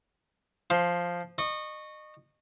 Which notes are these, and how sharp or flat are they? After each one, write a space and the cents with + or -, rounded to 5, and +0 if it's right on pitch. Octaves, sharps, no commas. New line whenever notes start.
F3 +0 C6 +20
D#5 -30 C#6 -10